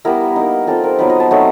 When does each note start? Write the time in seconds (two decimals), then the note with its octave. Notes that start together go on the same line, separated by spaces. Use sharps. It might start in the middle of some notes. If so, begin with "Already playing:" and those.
0.05 G3 B3 E4 A#4
0.36 A#3 D#4
0.67 G3 C4 F4 A4
0.84 A#4
0.99 F#3 B3 D#4 B4
1.10 D#5
1.20 A5
1.31 F#3 A3 C4 D#4